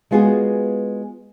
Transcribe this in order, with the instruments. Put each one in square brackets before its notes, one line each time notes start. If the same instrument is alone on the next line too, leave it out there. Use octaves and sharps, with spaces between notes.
[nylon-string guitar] G#3 B3 F4 F#4 G#4